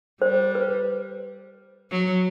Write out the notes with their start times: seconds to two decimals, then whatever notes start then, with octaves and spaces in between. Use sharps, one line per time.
0.22 G3 C5
0.55 B4
1.91 F#3